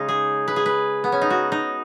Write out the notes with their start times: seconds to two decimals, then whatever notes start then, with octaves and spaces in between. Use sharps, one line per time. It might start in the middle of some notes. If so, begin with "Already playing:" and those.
Already playing: C#3 G#3 C#4 D#4
0.09 G#4
0.48 B4
0.56 G#4
0.66 B4
1.04 B3
1.12 C#4
1.22 D#4
1.30 F#4
1.52 D#4